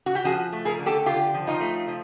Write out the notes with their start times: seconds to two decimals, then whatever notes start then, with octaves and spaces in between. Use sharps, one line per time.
0.06 F#4
0.15 G4
0.25 F3 F#4 G#4
0.52 A3
0.65 G#4 A#4
0.79 D3
0.86 G4 A4
1.06 D3 F4 G4
1.34 F3
1.47 D#4 F4
1.61 A3
1.88 F3